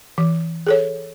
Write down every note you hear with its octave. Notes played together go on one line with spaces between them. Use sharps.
E3
G#4 A4 C#5